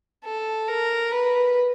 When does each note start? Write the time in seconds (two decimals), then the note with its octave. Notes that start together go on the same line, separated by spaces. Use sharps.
0.25 A4
0.68 A#4
1.12 B4